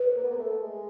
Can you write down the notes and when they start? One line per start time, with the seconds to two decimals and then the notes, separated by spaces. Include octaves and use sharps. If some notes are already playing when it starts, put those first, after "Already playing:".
Already playing: B4
0.16 A#3
0.23 B3
0.30 A#3
0.39 A3
0.62 G#3